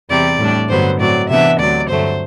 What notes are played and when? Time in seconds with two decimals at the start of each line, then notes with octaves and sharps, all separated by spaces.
0.10 E2 C3 G3 D5
0.39 A2 G3 D4
0.69 G2 D3 F#3 B3 C5
0.99 A2 F#3 C4 D5
1.29 C3 E3 B3 D4 E5
1.59 D2 C3 F#3 D5
1.89 G2 D3 F#3 A3 C5